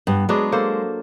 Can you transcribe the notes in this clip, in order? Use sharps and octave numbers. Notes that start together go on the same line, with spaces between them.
G2 B3
F#3 G#3 B3 D4
A#3 A4 C5